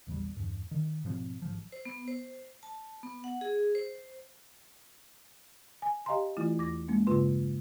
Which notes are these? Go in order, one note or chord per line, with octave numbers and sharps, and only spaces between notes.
A#1 E2 F3 G3
E2 G2
D#3
G#2 B2 F3 C4
G#1 F3
C5
B3
C5
A5
B3
F#5
G#4
C5
G#5
G4 D#5 F5 G#5 A#5 C6
E3 A3 E4 F4
E2 D6 A#6
G#3 A#3 C#4
G2 C#3 F4 B4 C6